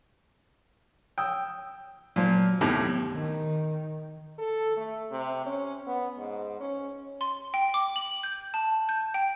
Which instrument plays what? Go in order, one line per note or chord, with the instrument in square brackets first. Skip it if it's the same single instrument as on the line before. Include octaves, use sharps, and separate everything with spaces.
[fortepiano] G5 D#6 E6
[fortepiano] A#2 F3 [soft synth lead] F#3
[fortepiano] D#2 A2 C3 [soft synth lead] B3
[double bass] D#3
[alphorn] A4
A3
C3
C#4
B3
G#2
C#4
[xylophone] C6
G5
D6
F#7
G6
A5
G6
G5